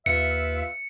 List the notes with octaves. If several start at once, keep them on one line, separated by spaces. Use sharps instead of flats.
D#2 F4 B4 E5 C#7